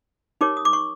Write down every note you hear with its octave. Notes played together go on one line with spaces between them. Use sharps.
D#4 G4 A#4 C#5 D6
D#6
D6
C#6